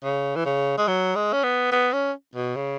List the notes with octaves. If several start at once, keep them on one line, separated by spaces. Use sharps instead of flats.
C#3
E3
C#3
G#3
F#3
G#3
C#4
B3
B3
C#4
B2
C#3